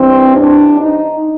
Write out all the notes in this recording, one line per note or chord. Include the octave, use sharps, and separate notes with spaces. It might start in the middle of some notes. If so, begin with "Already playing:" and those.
Already playing: G2 E3 C4
D4
D#4